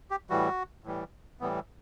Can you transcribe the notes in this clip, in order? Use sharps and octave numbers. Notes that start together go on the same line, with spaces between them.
G4
A2 E3 G3 F#4
A2 E3 G3
A2 E3 G3 B3